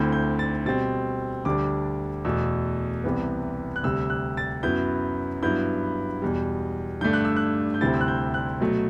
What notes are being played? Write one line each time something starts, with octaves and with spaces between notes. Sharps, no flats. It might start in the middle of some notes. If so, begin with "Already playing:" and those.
Already playing: D2 D3 A3 C4 E4 G6
G6
A6
B2 G3 C4 A6
D2 D3 G3 D4 D6
E2 B2 A3 E6
C2 C3 E3 B3
F#6
D2 C3 G3 E6
F#6
A6
F#2 F#3 B3 E4 G6
G2 F#3 B3 E4 G6
E2 B2 G3
G2 D3 A3 D4 G6
F#6
E6
F#6
G6
D2 C3 G3 C4 E4 A6
E6
F#6
G6
F#6
B2 F#3 A3